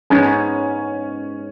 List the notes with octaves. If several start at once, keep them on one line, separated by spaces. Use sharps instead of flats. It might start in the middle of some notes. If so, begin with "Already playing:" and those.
G#2 G#3 B3 C#4